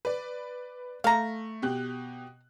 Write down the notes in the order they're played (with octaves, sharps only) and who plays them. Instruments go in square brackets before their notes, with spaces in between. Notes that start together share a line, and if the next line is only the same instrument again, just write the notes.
[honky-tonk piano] B4 D5
[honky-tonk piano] A3 [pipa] F5 A#5
[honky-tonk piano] B2 G4 F#6